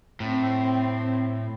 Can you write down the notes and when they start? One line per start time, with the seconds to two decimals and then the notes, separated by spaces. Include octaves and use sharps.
0.20 A2 C4